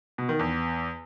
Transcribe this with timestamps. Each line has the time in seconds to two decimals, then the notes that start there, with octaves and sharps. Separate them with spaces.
0.18 B2
0.29 D#3
0.39 E2